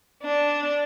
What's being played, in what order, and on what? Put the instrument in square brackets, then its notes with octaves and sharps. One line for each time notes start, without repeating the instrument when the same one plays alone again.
[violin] D4